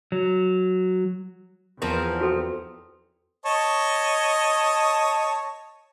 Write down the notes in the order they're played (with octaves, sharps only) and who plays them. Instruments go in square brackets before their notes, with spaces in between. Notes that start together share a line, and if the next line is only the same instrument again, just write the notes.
[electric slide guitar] F#3
[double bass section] E2 [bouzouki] F3 C4 A#4
[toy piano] F#4 A4 G5
[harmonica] C#5 D#5 A5